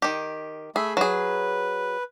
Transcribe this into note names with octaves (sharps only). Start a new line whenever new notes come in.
D#3 G4
A3 G#4 E5 B5
F#3 G#4 B4